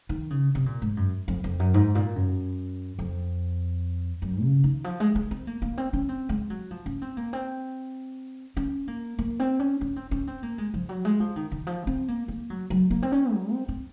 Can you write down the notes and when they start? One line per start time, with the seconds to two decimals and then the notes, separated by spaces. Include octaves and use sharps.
0.09 D#3
0.30 C#3
0.55 C3
0.66 A#2
0.82 G#2
0.97 F#2
1.28 F2
1.44 F2
1.59 F#2
1.74 G#2
1.95 A#2
2.16 F#2
2.99 F2
4.22 F#2
4.43 C#3
4.64 D#3
4.84 F3
5.00 G#3
5.15 G#3
5.31 C4
5.47 A#3
5.62 A#3
5.78 C4
5.93 C#4
6.09 C4
6.29 G#3
6.50 F#3
6.71 F3
6.86 C#4
7.02 C4
7.17 A#3
7.33 C4
8.57 C#4
8.88 A#3
9.19 A#3
9.39 C4
9.59 C#4
9.81 C#4
9.96 C4
10.11 C#4
10.27 C4
10.43 A#3
10.58 G#3
10.74 F3
10.89 F#3
11.05 G#3
11.20 F3
11.36 D#3
11.52 D#3
11.67 F3
11.87 C4
12.08 A#3
12.28 A#3
12.50 F#3
12.70 F#3
12.91 A#3
13.02 C4
13.12 C#4
13.32 F#3
13.52 C4
13.68 C4